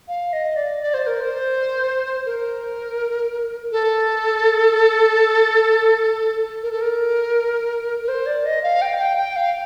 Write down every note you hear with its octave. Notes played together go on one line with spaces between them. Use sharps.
F5
D#5
D5
D5
C5
A#4
C5
A#4
A4
A#4
A4
A#4
A#4
C5
D5
D#5
F5
G5
G5
G5
F5